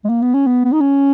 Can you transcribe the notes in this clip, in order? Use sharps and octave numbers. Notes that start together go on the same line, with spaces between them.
G#3
A#3
B3
C#4
B3
B3
D#4
C#4